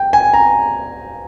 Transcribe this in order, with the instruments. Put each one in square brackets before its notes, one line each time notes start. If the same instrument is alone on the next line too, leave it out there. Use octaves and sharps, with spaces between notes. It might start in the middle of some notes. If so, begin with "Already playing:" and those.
Already playing: [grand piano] G5
G#5
A#5